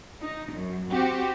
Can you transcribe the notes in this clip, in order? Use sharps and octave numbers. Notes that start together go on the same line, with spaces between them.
D#4
F#2
C4 F#4 G4